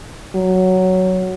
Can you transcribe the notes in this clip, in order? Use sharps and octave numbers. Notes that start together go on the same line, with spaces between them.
F#3